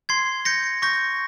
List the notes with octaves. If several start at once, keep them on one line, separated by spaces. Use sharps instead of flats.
C6 G#6 C7
G6 A#6 C#7
C#6 G6 A#6